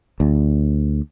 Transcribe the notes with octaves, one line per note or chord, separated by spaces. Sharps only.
D2